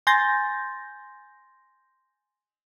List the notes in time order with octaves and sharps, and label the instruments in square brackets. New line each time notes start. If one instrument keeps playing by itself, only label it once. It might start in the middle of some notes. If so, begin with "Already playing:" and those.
[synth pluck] G#5 C6 G6 A6 A#6